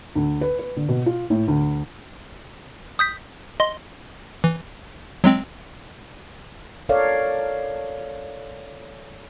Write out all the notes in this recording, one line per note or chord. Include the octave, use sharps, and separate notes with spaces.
D2
B4
B4
D3
B2
F4
A2
D2
D#6 G6 B6
D#5 C6
E3
F#3 G#3 C4
A4 A#4 C#5 D5 F5